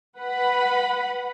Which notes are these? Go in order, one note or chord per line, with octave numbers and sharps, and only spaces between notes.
B4 F#5 B5